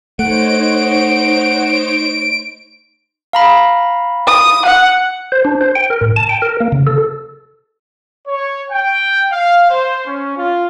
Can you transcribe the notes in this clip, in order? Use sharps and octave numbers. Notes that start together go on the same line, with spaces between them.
A3 D#4 C5 C#5 F#5 D7
F5 A#5 B5
D#6
F#5
C5
D4
C5
G5
A#4
A2
A5
G5
A#4
A#3
C#3
A4
C#5
G5
F5
C5
C#4
F4